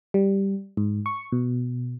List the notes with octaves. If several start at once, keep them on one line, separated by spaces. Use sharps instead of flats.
G3
G#2
C#6
B2